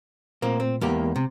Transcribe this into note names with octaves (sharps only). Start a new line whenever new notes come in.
A#2 A3 A#3 C4
C4
E2 G#3 A#3 B3 G4
C3